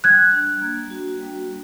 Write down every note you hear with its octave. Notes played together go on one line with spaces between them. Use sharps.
G3 F#6 G#6
D4
A#3
F#4
G3